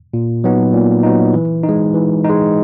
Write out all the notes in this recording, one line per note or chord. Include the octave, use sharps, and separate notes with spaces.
A#2
F#3 B3 D#4
A#2
F#3 B3 D#4
E3
D#4
G#3
E3
G#3 D#4